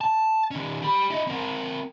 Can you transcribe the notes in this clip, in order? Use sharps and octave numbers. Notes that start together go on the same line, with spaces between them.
A5
D#3 C#4
G4 B5
E4 D#5
C4 A#4